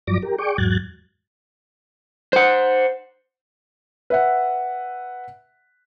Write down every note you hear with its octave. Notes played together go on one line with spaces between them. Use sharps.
G2 F3 F#3 D5 D6 A#6
G4 A#4
G#4 D5 G5 C#6 D6
E2 G#2 F#3 F#6 G#6 A6
C5 F#5
B4 E5 F#5